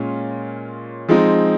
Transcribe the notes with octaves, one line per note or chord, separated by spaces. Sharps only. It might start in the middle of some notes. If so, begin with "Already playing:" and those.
Already playing: A#2 G#3 C#4 F4
F3 G#3 C4 D#4